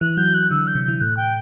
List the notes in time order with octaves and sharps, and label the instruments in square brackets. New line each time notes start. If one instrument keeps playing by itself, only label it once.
[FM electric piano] E3 [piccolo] F#6
[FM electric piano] F#3 [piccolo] G6
[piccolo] F#6
[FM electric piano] D3 [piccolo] E6
[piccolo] G6
[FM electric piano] C3
[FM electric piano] E3 [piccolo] G6
[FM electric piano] A2 [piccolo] F#6
[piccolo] G5